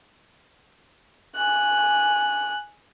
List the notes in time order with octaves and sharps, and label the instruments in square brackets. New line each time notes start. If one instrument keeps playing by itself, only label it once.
[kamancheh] G#5 F#6